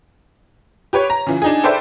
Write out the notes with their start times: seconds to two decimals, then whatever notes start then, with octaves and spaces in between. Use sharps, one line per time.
0.93 G4 B4 C#5
1.10 A#5
1.27 C#3 E3 F4
1.42 D4 D#4 G#4
1.63 A4 B4 C5 D5 E5 G5